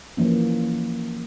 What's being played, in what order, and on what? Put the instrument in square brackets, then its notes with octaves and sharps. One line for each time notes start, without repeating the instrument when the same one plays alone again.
[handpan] E3 F3 A#3 C#4